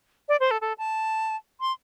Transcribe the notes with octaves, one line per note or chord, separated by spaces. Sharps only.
D5
C5
A4
A4
A5
C6